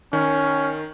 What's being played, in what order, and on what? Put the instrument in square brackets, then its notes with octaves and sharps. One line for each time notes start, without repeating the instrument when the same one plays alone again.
[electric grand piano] D#3 [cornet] C#4